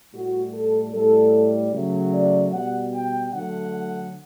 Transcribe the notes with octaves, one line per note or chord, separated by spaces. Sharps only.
A2 G3 F#4
A4
A2 G3 A4
C#3 F#3 A3
D5
B2 G3 F#5
G5
D3 F#3 A3 F#5